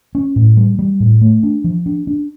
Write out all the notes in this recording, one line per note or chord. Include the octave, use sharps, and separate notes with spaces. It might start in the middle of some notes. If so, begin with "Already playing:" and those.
C#4
A2
G3
G3
A2
A3
D4
F3
D4
D4